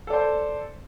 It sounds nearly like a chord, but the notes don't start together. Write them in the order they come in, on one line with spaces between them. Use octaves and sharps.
A4 D5 C5